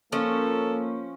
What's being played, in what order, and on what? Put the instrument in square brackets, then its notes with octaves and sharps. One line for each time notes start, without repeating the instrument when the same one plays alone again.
[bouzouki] F3 C#4 [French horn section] A#3 [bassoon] A4